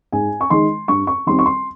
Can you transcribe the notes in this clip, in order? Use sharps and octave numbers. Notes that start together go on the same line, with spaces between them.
G#2 G#5
C#6
D#3 G#3 C6
G2 C#6
C#6
D#3 G3 C4 C6
C#6
C6